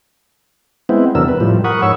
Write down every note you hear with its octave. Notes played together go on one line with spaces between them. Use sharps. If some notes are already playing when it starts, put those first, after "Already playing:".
G#3 B3 C4 E4
E2 C3 F#3 D4 A#4 E6
B4
A2 F3 G3
A#4 F#5 B5 C#6 D#6
G#2 C#5 C#6 E6